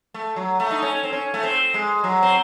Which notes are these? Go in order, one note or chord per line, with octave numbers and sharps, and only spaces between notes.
A3
F#3
A3
D#4
C#4
C4
C#4
A3
C4
G#3
F#3
C4